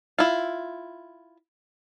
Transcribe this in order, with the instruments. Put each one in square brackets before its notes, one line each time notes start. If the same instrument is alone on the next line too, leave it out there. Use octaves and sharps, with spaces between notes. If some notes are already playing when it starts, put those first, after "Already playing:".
[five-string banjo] E4 F4